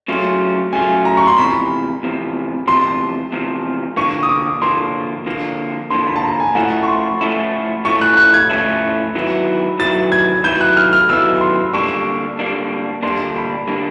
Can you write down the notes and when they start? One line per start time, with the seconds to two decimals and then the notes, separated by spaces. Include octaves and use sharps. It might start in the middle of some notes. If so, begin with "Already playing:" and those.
0.08 C#3 F#3 A3 C#4 F4
0.73 C#3 F#3 A3 C#4 F4 G#5
1.05 A#5
1.17 C#6
1.27 C6
1.38 E2 C3 F3 B5
2.03 E2 C3 F3
2.68 E2 C3 F3 C6
3.32 E2 C3 F3
3.96 D3 F3 A#3 C#6
4.23 D#6
4.29 D6
4.62 D3 F3 A#3 C6
5.26 D3 F3 A#3
5.90 D3 F3 A#3 C6
6.07 B5
6.16 A5
6.23 A#5
6.40 G#5
6.55 A2 F3 A3 C#4 E4 F#5
6.83 C#6
6.87 C6
7.21 A2 F3 A3 C#4 E4
7.85 A2 F3 A3 C#4 E4 C#6
8.01 F#6
8.17 F#6
8.34 G#6
8.50 A2 F3 A3 C#4 E4
9.15 D#3 F#3 B3 E4
9.79 D#3 F#3 B3 E4 A6
10.12 G#6
10.44 D#3 F#3 B3 E4 G6
10.61 F#6
10.77 F6
10.93 F6
11.09 D#3 F#3 B3 E4 E6
11.41 C6
11.74 D3 G3 A#3 D4 C#6
12.39 D3 G3 A#3 D4
13.03 D3 G3 A#3 D4 C6
13.36 B5
13.68 D3 G3 A#3 D4